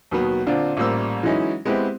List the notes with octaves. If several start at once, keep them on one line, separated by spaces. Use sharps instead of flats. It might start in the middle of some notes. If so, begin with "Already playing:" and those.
D#2 B2 D#3 F#3 B3
A#2 D3 C4 D4 F4
A1 A#2 G3 A#3 C5 E6
E3 F#3 G#3 C#4 D#4 E4
G#3 B3 C4 E4 G4